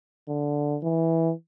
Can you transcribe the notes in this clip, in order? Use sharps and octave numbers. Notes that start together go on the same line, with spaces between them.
D3
E3